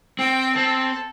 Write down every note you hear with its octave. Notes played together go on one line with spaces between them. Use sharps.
C4 G5
C4 A4